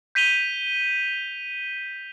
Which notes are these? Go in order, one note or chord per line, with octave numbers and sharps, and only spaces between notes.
G6 B6 D#7 F7 G7